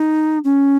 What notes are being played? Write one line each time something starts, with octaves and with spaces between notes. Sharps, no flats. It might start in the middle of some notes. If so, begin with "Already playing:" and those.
Already playing: D#4
C#4